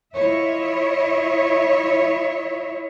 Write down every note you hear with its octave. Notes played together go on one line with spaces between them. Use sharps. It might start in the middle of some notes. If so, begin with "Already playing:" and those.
E4 F4 C#5 D#5 E5